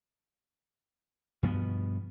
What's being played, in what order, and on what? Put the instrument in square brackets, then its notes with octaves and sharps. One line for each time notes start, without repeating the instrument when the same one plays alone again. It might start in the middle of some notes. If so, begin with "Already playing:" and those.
[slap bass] G2 B2 F3 B3